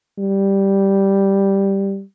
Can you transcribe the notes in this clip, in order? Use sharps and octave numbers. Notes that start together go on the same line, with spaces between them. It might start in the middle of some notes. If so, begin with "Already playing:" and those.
G3